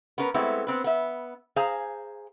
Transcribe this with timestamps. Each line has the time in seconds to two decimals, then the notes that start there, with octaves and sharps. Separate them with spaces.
0.18 B3 C#4 A#4 B4
0.34 G#3 A3 B3 C4 E4
0.67 B3 C4 B4
0.84 B3 E5
1.56 G#4 C5 F5 G#5 A#5